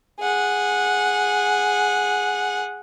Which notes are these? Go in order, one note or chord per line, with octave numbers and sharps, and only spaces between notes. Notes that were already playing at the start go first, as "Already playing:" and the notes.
G#4 F#5